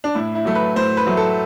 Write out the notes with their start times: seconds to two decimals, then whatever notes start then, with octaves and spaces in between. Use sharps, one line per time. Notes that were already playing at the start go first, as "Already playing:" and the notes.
0.04 D4
0.15 A2 E4
0.35 E4
0.45 F#3 A3
0.55 B4
0.76 A2 C5
0.97 B4
1.07 F#3 A3
1.17 A4